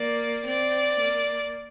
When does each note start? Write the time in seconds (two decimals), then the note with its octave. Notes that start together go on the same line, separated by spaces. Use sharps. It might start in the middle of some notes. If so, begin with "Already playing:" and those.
Already playing: A#3 D5
0.46 C4 D5
1.01 A#3